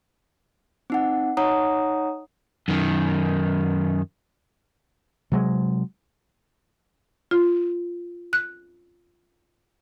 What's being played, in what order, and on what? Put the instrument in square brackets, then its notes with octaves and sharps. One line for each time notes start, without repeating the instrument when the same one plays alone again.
[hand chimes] C4 D#4 F#5
D#4 C#5 F#5 A#5 D#6
[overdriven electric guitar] F#2 D#3
[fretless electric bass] C3 F#3 G#3
[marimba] F4
F#6